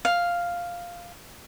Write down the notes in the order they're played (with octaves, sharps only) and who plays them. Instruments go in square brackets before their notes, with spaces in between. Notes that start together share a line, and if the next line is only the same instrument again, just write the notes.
[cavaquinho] F5